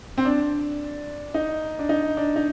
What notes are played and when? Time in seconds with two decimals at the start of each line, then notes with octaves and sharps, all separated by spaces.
0.18 C4
0.25 D4
1.34 D#4
1.79 D4
1.89 D#4
2.17 D4
2.36 D#4